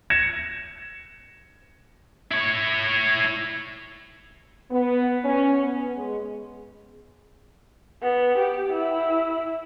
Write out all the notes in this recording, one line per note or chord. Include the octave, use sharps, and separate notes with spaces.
G#6 A#6 C#7 E7
E4 C#5
B3
C#4
B3
G#3
B3
G4
E4